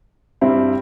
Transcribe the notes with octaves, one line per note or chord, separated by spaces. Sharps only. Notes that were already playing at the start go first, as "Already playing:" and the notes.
G2 G3 C4 E4